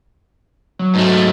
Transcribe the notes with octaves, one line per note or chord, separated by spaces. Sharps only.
F#3
G#2 A3